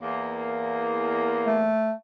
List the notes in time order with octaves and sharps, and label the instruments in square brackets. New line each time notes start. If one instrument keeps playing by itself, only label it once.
[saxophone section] E2 A#3
[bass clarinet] A3